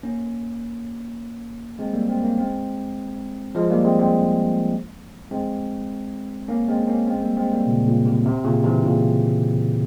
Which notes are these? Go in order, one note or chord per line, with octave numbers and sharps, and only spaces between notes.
A#3 C#4
G#3 C4
G3 A#3
G#3 C4
A#3 C#4
G#3 C4
F3 G#3
G3 A#3
G#3 C4
G#3 C4
G#3 C4
A#3 C#4
G#3 C4
A#3 C#4
G#3 C4
G3 A#3
G#3 C4
G3 A#3
A#2 C#3
A#2 C#3
C3
C3
A#2 C#3
C3 E3
A#2 C#3